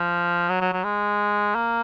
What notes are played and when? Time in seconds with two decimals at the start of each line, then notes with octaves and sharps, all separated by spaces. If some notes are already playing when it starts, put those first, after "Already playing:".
Already playing: F3
0.49 F#3
0.61 F#3
0.72 F#3
0.84 G#3
1.55 A#3